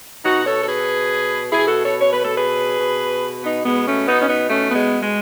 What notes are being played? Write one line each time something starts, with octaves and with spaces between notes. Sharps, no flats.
B2 D#4 F#4
A4 C#5
A4
G#4 B4
B2 E4 G#4
F#4 A4
A4 C#5
C#5
B4
A4
G#4 B4
B2
B3 D#4
G#3 B3
A3 C#4
B2 B3 D#4
C#4
B3 D#4
A3 C#4
G#3 B3
G#3